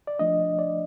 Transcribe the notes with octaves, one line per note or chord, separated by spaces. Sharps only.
D5
F3 A3 D4 D#5
D5